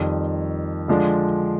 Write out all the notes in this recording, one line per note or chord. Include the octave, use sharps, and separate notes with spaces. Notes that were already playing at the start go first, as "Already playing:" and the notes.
Already playing: F2 D#3 G3
D3 F3 G#3 D4